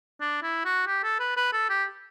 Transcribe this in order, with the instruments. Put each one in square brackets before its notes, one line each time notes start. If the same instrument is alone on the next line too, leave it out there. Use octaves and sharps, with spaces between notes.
[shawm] D4
E4
F#4
G4
A4
B4
B4
A4
G4